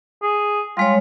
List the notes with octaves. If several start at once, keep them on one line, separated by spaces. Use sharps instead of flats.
G#4
G3 G#3 F4 C#5